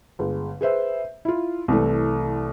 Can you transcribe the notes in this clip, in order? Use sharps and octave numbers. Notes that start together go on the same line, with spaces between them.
G1 G#3
G#4 B4 C5 E5
E4 F4
C2 E3 A3